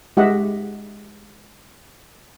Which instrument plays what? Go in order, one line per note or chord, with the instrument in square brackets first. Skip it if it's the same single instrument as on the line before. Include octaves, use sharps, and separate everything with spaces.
[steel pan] G#3 G4 D#5 E5 F#5